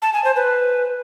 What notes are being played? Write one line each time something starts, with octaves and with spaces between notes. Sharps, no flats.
A5
G#5
C5
B4